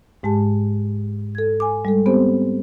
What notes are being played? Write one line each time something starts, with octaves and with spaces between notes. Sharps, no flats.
G#2 G#3 G4 A5
A4 G#6
G#5 D6
G3 G#3 A4
B3 C4 G4 C5